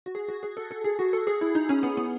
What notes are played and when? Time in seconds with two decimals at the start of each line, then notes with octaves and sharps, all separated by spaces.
0.06 F#4
0.15 G#4
0.29 F#4
0.43 G#4
0.57 A4
0.71 A4
0.84 G#4
0.99 F#4
1.13 A4
1.27 G#4
1.41 E4
1.55 D#4
1.69 C#4
1.83 B3
1.97 B3